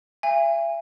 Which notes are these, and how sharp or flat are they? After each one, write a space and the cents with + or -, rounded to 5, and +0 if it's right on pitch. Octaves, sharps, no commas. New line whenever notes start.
E5 +40 G#5 -35